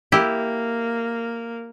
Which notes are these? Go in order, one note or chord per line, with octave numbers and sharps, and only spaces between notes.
A#3 E4 G4